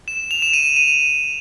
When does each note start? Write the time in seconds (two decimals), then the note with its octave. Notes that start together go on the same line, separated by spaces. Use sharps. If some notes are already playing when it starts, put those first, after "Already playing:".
0.08 E7
0.31 F7
0.42 E7
0.53 D#7
0.76 D#7